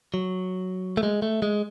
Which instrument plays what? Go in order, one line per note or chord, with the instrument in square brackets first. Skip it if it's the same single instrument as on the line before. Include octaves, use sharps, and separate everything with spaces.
[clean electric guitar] F#3
A3
G#3
A3
G#3